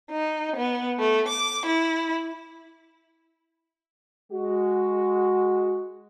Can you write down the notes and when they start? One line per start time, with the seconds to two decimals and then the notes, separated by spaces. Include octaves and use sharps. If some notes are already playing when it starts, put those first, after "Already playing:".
0.10 D#4
0.57 B3
0.99 A3
1.29 D6
1.65 E4
4.32 G#3 F#4